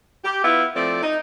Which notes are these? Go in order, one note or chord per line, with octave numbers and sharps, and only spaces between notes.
G4
B3 E4 F4
F3 A3 C4 D5
D#4